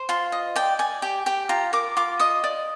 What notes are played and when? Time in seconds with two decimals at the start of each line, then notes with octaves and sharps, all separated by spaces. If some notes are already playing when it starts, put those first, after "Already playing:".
Already playing: C5
0.09 F4 C6
0.32 D#5
0.56 D5 G5
0.79 D5 G#5
1.02 G4 G5
1.26 G4 G5
1.49 F4 A#5
1.73 A#4 D6
1.97 F4 D6
2.20 D#5 D#6
2.44 D5